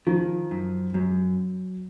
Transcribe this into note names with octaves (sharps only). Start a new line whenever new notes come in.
D#3 F3
F#2
F#2 F#3